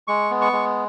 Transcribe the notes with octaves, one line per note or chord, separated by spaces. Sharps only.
G#3 C#6
B3
C#6
G#3